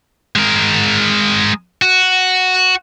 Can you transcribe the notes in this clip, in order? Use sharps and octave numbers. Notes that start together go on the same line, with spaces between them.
G#3 A#4
F#4